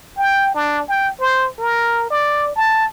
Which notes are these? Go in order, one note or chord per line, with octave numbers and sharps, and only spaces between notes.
G5
D4
G5
C5
A#4
D5
A5